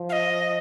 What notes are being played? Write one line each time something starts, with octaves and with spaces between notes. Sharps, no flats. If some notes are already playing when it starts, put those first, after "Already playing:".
Already playing: F3
F5
D#5